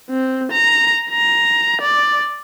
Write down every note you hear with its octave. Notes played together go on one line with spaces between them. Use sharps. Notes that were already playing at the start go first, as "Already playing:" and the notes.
C4
A#5
A#5
D5